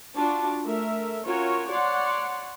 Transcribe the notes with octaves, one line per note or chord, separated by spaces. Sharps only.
D4 F4 F#4 A5
A3 A#4 E5
C#4 F4 F#4 A#4 C#5
C#5 D5 F#5 C6